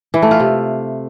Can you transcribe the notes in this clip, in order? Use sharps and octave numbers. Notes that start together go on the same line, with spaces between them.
E3
A3
F4
C3